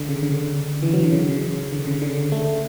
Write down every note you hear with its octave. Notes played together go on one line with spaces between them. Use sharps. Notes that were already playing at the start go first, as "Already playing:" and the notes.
Already playing: D3
C#3
D3
E3
F#3
D3
C#3
C#3
D3
C#3
D3
A3